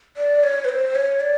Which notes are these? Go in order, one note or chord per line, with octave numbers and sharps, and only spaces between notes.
D5
C#5
B4
C5
C#5
D5